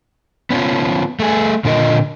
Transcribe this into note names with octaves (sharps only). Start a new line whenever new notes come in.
B3 C#4 F4
A3 G#4
A#2 D3 F4 A#4 D#5